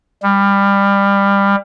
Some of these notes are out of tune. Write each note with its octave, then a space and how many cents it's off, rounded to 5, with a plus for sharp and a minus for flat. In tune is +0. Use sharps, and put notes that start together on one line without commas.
G3 +25